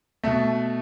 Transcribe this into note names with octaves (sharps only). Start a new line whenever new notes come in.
B2 A3 E5